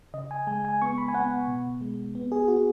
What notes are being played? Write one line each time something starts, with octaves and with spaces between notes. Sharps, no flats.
C#3 D#5
G#5
G#3 G#5
G#5
B3 C#6
B5
G#5
B3 F#5
B2
G#3
B3
G#4
B3 F#4